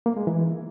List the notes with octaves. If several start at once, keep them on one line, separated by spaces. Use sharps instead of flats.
A#3
G#3
E3